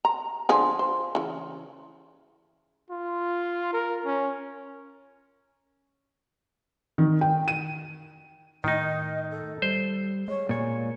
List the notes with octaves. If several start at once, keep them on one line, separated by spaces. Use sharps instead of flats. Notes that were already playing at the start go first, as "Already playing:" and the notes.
A#5
D3 F3 G#4
C5
C#3 E3
F4
A#4
C#4
D#3
G5
D#7
A2 D#3 D#4 D#5
A4
G3 C5
G#3 C#5
A#2 C#5 G#5